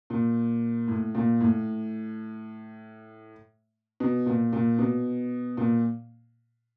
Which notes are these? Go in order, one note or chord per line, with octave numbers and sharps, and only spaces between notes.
A#2
A2
A#2
A2
B2
A#2
A#2
B2
A#2